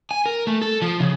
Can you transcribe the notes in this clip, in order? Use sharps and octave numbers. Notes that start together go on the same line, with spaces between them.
G#5
A#4
A3
A4
F3
C#3